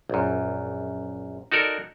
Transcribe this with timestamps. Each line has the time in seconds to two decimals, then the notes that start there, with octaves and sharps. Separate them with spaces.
0.10 A#1 F#2
1.52 D#4 F#4 A4 A#4 D5